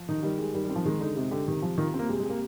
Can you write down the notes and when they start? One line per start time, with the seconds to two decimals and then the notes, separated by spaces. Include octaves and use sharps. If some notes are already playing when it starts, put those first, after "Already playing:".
Already playing: F3
0.09 D#3 D#4
0.23 D#3 G3
0.38 G3 G#3
0.54 D#3 G3
0.65 G3
0.70 C4
0.76 F3
0.85 D#3 G#3
1.01 D3 D#4
1.16 C3 G#3
1.31 D3 G4
1.48 C3 D#3
1.62 F3 G3
1.78 D#3 F4
1.94 C4
1.99 A#3
2.09 C3 G#3
2.20 G#3
2.25 G3 A#3